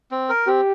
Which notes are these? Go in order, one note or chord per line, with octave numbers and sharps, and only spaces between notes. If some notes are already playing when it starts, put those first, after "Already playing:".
C4
A#4
C4 G4